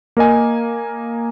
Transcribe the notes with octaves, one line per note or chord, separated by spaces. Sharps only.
A#3 A#4 D#5 G#5